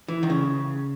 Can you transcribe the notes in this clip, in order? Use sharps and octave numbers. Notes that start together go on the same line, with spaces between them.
E3
D#3
C#3